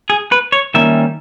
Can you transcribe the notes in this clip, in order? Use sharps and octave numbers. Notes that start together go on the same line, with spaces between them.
G#4
B4
C#5
D#3 G3 A#3 C#4 E5